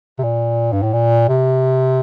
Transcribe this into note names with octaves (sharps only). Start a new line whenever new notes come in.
C3
A#2
G2
A2
A#2
C3